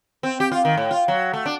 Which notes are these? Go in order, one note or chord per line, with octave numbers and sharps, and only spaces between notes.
C4
G4
F4
D#3
A2
F4
F#3
A3
D4